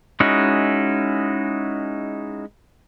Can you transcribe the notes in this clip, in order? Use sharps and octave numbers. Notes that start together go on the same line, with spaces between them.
G#3 C#4 D#4 E4 F#4